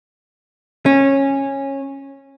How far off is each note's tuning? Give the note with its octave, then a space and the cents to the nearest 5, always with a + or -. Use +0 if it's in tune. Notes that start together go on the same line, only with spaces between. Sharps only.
C#4 -15